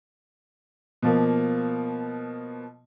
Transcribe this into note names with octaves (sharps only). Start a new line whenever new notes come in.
B2 F3 A#3